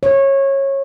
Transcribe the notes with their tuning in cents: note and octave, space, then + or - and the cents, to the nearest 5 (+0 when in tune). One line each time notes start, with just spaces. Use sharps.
C#5 -20